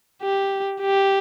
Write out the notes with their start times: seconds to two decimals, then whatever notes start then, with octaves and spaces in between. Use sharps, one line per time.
0.22 G4
0.81 G4